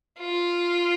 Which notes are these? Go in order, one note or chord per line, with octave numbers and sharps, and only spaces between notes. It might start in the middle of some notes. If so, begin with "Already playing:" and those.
F4